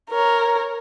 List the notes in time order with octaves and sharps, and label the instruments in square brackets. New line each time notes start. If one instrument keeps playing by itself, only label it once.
[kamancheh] A#4 C#5